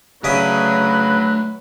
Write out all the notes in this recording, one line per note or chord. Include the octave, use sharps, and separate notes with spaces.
C#3 F#3 A3 B4 D5 E5 B5 D#6